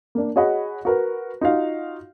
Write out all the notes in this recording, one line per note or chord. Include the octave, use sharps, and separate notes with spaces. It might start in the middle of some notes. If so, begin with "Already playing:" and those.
A#3 D4
F#4 G#4 C#5 D#5 F#5 B5
F#4 A#4 B4
D#4 F4 F#4 F5